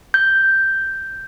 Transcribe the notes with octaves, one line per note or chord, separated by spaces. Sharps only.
G6